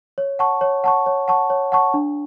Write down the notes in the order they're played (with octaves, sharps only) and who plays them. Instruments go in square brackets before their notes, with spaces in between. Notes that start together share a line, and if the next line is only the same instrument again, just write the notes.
[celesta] C#5
F#5 A5 C#6
C#5
F#5 A5 C#6
C#5
F#5 A5 C#6
C#5
F#5 A5 C#6
D4